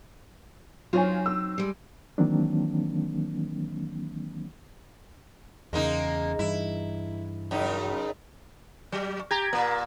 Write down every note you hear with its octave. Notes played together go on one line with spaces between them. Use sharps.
F#3 C4 D#4 F4 C#5 G#5
E6
G3 G#3
D#3 E3 F#3 A#3 C4 D4
E2 C#3 G#3 A#3 D#4
G2 E3 E4
F#2 C#3 D#4
F#3
G4 A#5 G#6
A#2 A#3